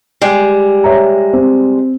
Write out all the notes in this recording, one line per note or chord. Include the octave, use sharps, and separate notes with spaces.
G3 G#3
C#5 E5 A#5
C4